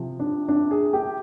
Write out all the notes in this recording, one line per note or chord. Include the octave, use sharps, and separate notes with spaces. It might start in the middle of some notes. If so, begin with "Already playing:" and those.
Already playing: C3 F3
D4
D4
G#4
G4